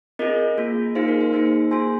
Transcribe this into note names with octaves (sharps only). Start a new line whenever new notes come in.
C4 F4 G#4 A#4 D#5
A#3 F4 G#4
A#3 D#4 G#4 C5 F5
A#4
C5
A#3 D#4 G#4 C5
A#3 F4 G#4 G#5 C6